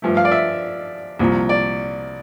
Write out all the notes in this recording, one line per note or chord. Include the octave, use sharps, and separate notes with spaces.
G2 F3 A3
F5
D5
E5
C2 A#2 F3
D5